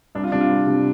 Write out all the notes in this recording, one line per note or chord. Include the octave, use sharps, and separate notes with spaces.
C2 D4
F4
C3 G3 D4
F4
C2
C3 G3